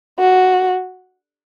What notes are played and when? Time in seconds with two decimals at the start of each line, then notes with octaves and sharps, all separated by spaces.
0.19 F#4